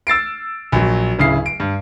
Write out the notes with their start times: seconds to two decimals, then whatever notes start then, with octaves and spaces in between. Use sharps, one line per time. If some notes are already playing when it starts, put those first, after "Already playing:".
0.07 E6 A6 C7 D7
0.72 A#1 F#3
1.19 D1 C#3 E4 C7
1.46 D7
1.60 G2